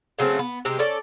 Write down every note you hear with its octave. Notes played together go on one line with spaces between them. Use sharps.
C#3 F#3 A3 C4
B3
C3 G#3 G4
C#4 A4 D5